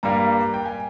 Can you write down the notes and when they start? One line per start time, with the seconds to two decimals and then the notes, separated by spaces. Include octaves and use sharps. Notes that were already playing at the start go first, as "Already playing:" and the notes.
0.03 G2 G3 A#3 A#5
0.54 G5
0.65 G#5